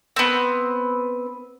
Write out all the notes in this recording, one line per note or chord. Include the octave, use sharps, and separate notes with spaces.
B3 C4